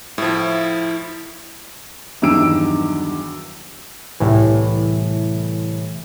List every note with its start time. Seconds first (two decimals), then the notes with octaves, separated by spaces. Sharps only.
0.18 A2 F3 E4
2.22 E2 G2 D#3 F#3 E6 D7
4.20 C2 A2 E3